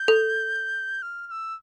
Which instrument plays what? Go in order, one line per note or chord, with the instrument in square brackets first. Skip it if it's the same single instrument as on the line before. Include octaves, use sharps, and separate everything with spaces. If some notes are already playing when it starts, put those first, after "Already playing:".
Already playing: [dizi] G6
[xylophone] A4
[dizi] F6
F6
E6